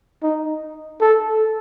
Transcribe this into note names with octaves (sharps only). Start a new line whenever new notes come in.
D#4
A4